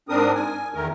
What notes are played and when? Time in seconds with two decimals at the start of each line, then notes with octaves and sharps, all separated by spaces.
0.09 G#2 C4 D4 A#4 D#6
0.35 G#5
0.74 E2 D#3 A3 A#4